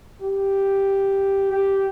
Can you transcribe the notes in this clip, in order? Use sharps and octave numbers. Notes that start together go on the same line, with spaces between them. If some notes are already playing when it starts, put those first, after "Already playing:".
G4
G4